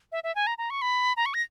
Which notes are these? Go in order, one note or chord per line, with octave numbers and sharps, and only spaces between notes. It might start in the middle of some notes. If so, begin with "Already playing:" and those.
E5
E5
G#5
A#5
A#5
C#6
B5
A#5
C#6
A#6